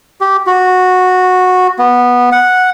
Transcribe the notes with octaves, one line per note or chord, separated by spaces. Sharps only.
G4
F#4
B3
F#5